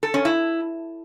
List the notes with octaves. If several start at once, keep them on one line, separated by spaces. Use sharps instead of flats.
A4
C#4
E4